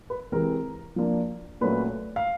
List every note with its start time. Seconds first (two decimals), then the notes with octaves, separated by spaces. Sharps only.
0.10 B4
0.32 C3 E3 G#3 C4 A#4
0.96 F3 A#3 D4
1.61 A#2 F#3 A3 C#4 B4
2.16 F5